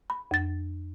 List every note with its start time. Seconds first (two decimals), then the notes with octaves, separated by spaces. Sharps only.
0.10 B5
0.31 F2 A6